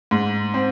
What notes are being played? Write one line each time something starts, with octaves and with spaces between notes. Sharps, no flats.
G#2
C4